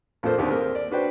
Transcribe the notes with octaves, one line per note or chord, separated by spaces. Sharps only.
A#1 F2 A#3 F4 A4 C5
D#2 D3 C4 D4 G4
A#3 C4 G#4 A#4
D5
D4 F#4 B4 C5 D5 G5